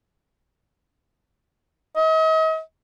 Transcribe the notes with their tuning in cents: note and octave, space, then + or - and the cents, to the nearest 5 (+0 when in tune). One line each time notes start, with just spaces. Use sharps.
D#5 +40